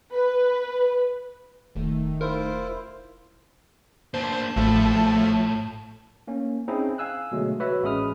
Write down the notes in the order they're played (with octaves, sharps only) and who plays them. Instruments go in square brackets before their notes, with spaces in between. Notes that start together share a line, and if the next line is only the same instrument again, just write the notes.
[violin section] B4
[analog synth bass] E1 [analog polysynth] D#3 A3
[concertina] E4 F4 C5 [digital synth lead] A#4
[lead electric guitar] A#3 D4 [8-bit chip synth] C5 [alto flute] A5
[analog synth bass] A1 [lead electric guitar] A2 [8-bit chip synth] F3 A3
[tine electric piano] A#3 C#4
C4 C#4 D#4 E4 G#4
F5 G#5 E6 F#6
B2 D3 F#3 G#3 A3
F#4 B4 C#5 E5
A1 G#3 C#4 B5 D#6 F6